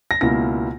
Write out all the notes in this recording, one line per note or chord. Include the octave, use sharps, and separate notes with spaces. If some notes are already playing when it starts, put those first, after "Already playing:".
A#6
C#2 B2 A#3 E4 A#6